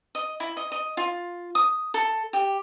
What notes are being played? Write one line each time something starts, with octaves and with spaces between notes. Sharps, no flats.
D#5
E4
D#5
D#5
F4
D#6
A4
G4